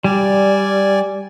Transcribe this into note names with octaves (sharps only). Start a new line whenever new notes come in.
G3 D5 G#5